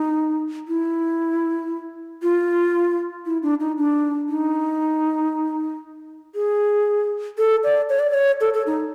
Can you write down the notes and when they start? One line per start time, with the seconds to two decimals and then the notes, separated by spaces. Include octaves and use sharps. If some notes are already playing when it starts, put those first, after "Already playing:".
Already playing: D#4
0.68 E4
2.22 F4
3.26 E4
3.43 D4
3.60 D#4
3.78 D4
4.29 D#4
6.35 G#4
7.38 A4
7.64 D5
7.89 C#5
7.99 D5
8.10 D5
8.14 C#5
8.41 A4
8.54 A4
8.67 D#4